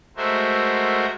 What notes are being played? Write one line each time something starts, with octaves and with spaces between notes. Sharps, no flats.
G#3 A3 F#4 A#4 C5 E5